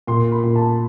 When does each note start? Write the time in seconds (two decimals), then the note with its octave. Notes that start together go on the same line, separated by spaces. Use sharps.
0.07 A#2 C6
0.31 B5
0.44 A#2
0.55 A5